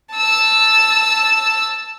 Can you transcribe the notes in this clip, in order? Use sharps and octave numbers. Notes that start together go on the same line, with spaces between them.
A5 E6